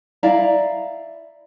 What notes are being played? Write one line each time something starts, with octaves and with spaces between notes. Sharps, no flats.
E4 D5 F5 A#5